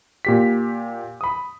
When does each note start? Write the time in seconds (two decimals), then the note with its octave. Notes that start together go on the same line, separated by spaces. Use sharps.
0.25 A#2 G4 B6
1.21 B5 D#6